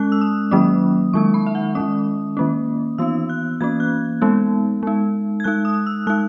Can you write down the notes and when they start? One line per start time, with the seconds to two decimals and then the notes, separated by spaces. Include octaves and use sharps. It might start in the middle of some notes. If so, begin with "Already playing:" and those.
Already playing: G#3 C#4 F#6
0.12 E6
0.21 D#6
0.51 D#3 F#3 A#3 C#4 D#6
1.13 D#3 G#3 D#4 C#6
1.34 B5
1.47 E5
1.55 F#5
1.75 D#3 G#3 C#4 D#6
2.37 D#3 A#3 C#4
2.98 E3 B3 D#4 E6
3.29 F#6
3.61 E3 A#3 C#4 G#6
3.80 F#6
4.22 G#3 B3 D#4
4.83 G#3 D#4
5.40 G#6
5.44 G#3 D#4 F#6
5.65 D#6
5.87 E6
6.07 G#3 D#4 F#6